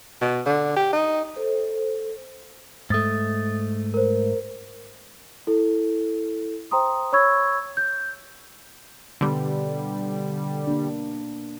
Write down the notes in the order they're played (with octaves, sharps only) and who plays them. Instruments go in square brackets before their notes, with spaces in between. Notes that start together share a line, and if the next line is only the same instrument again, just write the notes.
[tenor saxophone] B2
D3
G4
D#4
[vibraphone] A4 C5
[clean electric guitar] G#2 A3 [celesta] D#6 A6
[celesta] A#4 C5
E4 A4
C5 G5 A#5 C6 D#6
C#5 B5 C#6 E6 G#6
G6
[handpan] B2 B3 [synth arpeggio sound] D3 G3
[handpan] A#3 D4